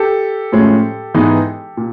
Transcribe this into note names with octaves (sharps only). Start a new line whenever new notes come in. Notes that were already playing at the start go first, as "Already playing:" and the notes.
Already playing: G4 A4
A2 F3 G#3 C#4
G#2 E3 G#3 B3 D#4
A#2